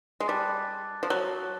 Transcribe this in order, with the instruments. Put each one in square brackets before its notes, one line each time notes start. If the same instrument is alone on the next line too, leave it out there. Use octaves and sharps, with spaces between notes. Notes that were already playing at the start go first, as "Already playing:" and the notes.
[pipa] G#3
[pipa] G3 [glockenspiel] A5 D6 F#6 A6
[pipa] F3
F#3